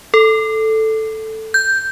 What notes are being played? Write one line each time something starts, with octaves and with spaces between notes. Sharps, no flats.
A4
G6